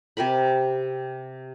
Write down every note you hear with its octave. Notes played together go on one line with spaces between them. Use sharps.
C3 G4 A#4 B5